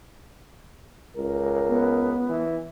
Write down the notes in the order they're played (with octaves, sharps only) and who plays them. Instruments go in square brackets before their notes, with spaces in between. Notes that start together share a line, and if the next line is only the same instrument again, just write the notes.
[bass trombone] C#2 [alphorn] A#4
[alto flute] B3
[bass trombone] E3